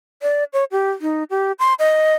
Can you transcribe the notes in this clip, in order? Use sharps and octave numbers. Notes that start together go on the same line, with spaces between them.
D5
C#5
G4
D#4
G4
C6
D#5